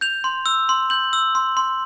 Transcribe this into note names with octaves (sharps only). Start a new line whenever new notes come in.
G6 F7
C6
E6
C6
G6 F#7
E6
C6
C6